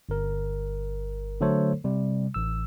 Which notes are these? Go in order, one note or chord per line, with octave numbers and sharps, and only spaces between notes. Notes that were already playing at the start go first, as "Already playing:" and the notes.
G1 A#4
D3 F#3 A3 A4 C5 C#5
C3 G3
A1 E6